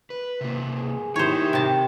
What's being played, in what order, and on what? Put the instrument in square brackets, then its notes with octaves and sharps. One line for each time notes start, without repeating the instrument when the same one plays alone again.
[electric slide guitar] B4
C3 A#3
[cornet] G#4
[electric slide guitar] D#4 A#4 [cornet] E4 [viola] G4 [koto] C5 C#5
[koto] C3 A5 [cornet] G5